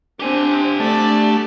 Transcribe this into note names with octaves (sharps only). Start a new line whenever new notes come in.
C4 D4 G4 G#5
A3 D4 D5